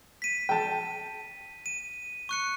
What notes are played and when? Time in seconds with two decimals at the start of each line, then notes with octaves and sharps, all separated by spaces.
0.22 B6 D#7
0.49 G5 A5
1.66 D#7
2.29 C#6 F#6 C#7